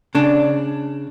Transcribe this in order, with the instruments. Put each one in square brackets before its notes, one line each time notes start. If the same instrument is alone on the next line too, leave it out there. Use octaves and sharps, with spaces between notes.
[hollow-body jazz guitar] C#3 D4